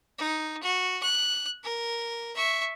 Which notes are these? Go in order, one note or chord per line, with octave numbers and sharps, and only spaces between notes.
D#4
F#4
F#6
A#4
E5 C#6